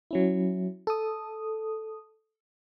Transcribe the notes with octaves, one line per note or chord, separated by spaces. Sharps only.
F#3 C#4 E4
A4 D#6